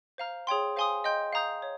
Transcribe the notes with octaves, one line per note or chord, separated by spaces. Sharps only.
C5 F5 A#5 F6
G#4 C#5 G5 C6
C5 F5 G#5 C6 D#6
D#5 G5 C6 G6
F5 A#5 D#6 G6
C#5